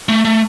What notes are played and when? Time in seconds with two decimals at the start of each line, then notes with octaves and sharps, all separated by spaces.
0.09 A3
0.25 A3